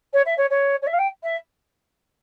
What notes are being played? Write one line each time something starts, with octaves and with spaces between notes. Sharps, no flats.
C#5
E5
C#5
C#5
C#5
E5
F5
G5
E5